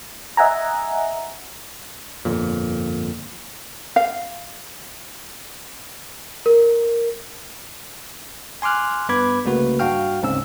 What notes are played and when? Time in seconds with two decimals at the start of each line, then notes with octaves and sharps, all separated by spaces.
0.37 D#5 E5 F#5 G#5 A#5
2.25 G1 F2 A#2
3.96 F5
6.46 A#4
8.62 G#5 C6 D6 F6 F#6
9.09 G2 B3 B4 B5 D6 G#6
9.45 C2 C#3 A3 A#3 F#4 B4
9.79 G2 F#4 F5 G5 F6
10.22 D2 G#2 C#3 C4 C#4 E6